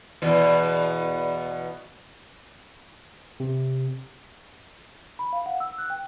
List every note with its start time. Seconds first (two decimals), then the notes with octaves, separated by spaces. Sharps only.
0.22 E2 B2
3.40 C3
5.19 B5
5.33 F5
5.46 F#5
5.60 E6
5.78 F#6
5.90 G5